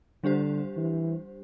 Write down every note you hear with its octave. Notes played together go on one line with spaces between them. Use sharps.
D3 G3 D4 G4 C5
E3